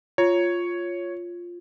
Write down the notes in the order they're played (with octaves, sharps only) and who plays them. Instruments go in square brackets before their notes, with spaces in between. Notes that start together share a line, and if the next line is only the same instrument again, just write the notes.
[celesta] F4 [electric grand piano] C#5